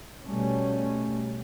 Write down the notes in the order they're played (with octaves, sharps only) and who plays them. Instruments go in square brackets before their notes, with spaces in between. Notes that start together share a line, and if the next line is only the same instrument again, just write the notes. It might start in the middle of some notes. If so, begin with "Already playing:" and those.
[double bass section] B2 G3 A3 C#4